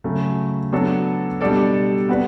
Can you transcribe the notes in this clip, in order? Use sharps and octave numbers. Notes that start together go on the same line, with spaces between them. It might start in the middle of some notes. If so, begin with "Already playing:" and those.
C#3 F#3 A3
F#3 B3 D4 F#4 A4
B2 G3 D4 A4 D5
B3 F#4 B4 D5